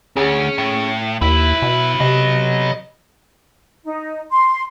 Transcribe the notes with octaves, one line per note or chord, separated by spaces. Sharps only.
D2 C#4 G#4
A2
D#2 F#3 E4 B4 E5
B2
C3 D#5
D#4
C6